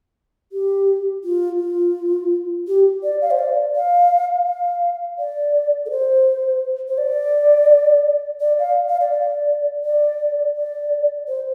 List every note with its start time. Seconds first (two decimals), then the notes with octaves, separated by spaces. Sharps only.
0.52 G4
1.24 F4
1.60 F4
2.67 G4
3.03 D5
3.21 F5
3.31 C5
3.39 D5
3.75 F5
4.47 F5
5.19 D5
5.86 A4
5.90 C5
6.88 C5
6.98 D5
8.41 D5
8.59 F5
8.89 F5
9.00 D5
9.12 D5
9.84 D5
10.56 D5
11.28 C5